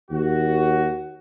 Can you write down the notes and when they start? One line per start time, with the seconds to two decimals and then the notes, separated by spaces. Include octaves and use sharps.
0.11 D#2 F#4